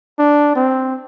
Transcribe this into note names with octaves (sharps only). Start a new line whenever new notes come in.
D4
C4